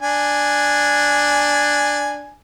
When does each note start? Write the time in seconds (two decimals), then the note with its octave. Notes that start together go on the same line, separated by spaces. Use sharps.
0.02 D4 G#5